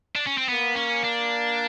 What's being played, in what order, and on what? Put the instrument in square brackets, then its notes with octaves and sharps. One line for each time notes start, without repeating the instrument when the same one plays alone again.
[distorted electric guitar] D4
C#4
C4
[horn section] A#3 [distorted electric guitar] B3
[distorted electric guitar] C#4
D4